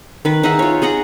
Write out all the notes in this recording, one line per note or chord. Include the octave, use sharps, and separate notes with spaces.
D#3 B4
D#4 G#4 E5 F#5
F4 C#5
G#4 D#5 F#5 A#5